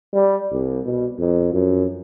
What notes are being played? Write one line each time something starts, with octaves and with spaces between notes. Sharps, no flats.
G3
C2
B2
F2
F#2